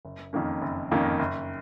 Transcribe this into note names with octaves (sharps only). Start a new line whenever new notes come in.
F#1
F2 D#3 A#3 C#4
F#1
F2 D#3 A#3 C#4
F#1